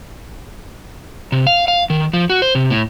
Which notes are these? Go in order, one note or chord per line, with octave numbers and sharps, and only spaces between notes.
C3
F5
F5
D#3
F3
F#4
C5
C3
A2